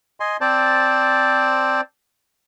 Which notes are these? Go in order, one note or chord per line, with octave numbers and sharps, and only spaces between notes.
D#5 G#5 C6
C4 C5 D5 A5